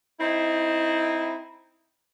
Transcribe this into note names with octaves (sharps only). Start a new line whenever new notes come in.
C4 D#4 E4